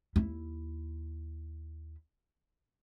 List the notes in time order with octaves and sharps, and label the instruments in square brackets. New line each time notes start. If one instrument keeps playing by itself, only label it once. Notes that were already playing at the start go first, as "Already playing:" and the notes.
[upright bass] D#2 E4